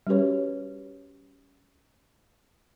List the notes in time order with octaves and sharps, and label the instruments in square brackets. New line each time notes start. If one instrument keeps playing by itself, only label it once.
[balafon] G3 C#4 F#4 G4 B4 C#5